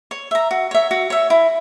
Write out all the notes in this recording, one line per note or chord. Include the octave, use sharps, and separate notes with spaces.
C#5
E5 A#5
F#4
C#5 E5
F#4
C#5 E5
E4